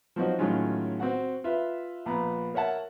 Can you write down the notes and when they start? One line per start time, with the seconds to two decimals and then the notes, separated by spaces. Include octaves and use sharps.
0.16 F3 F#3 C4 D#4 F#4
0.39 A2 D#3 F#3 G#3 C#4 F4
1.00 C4 F#4 F#5
1.44 F4 B4 E5
2.06 A#1 B3 A#5
2.54 A#4 C#5 E5 F#5 A5